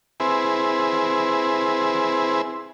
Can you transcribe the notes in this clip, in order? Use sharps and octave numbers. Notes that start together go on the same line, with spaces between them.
C4 E4 G#4 B4